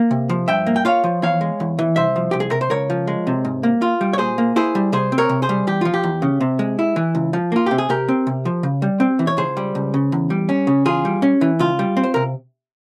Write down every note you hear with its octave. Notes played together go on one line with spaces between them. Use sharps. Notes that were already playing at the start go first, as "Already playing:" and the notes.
Already playing: A#3
C3
F3
G2 E5 G5
A#3
G5
F4 C#5 F5
F3
E2 C#5 F5
G#3
E2
E3
C2 C5 E5
F3
C2 G4
G#4
C3 A#4
C5
C#2 A#4 C#5
F3
G#3
C3
G#2
A#3
F4
G3
C#5
A#2 G#4 C5
A#3
E4 G#4 C5
G3
C3 G#4 C5
C4
A#4 C#5
C3
G#4 C5
G3
E2 G4
F3 F4
G4
E2
C#3
C3
G#3
E4
E3
C#2
F3
A#3 F4
C3 G4
G#4
C3 G4 A#4
C4
C3
F3
C#3
G3
C4
E3
C#5
C#2 G#4 C5
G3
C#2
C#3
E2
G3
C#4
C#3
E2 F4 G#4
G3
C#4
E3
C#2 F4
G3
C4
C5
C3 A#4